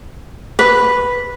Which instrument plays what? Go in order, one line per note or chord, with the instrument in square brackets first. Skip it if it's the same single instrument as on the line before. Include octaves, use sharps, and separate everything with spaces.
[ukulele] B4